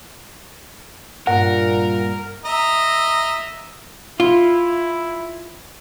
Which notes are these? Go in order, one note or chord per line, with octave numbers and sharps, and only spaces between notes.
G2 A#2 A#4 F#5
D#5 E5 A#5
E4 F4